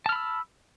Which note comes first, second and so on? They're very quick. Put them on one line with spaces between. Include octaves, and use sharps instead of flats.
A5 F6 B5 E6